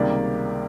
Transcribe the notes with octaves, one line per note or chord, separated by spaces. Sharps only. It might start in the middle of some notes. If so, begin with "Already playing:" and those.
Already playing: C#2 C3 D#3 G3 A#3 D5